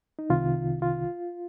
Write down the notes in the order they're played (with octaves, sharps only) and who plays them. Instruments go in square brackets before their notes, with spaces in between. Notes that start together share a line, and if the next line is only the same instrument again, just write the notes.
[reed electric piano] D#4
C2 C3 D#3 F4
F4